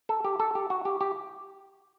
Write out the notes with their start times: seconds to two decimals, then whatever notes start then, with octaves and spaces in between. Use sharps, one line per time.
0.09 A4
0.25 G4
0.40 A4
0.55 G4
0.70 F#4
0.85 G4
1.01 G4